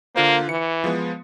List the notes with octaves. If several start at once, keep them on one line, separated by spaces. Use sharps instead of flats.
D3 A#3 F4 C5
E3 C#7
F3 G#3 B3